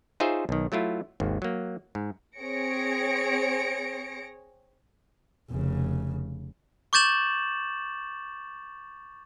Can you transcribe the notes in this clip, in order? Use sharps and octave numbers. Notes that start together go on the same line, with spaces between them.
D#4 F4 G#4 C5 C#5 E5
B1 D#3
F#3 A3 E4 F4
G#1 D#2
F#3 A#3
G#2
C4 G#4 C#5 A#6 C#7 D7
F1 C#3
C#6 D6 G6 A6 E7 F#7